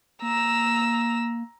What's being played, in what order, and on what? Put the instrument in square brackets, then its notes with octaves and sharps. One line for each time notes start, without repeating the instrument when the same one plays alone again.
[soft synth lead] A#3 [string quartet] A#5 E6